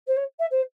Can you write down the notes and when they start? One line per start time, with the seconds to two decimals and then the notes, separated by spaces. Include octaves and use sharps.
0.07 C5
0.16 C#5
0.39 E5
0.50 C5